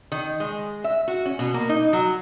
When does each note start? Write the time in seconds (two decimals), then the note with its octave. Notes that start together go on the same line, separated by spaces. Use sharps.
0.12 D#3
0.40 G#3
0.84 E5
1.08 F#4
1.25 C#4
1.39 B2
1.54 A#3
1.69 D#4
1.93 F#3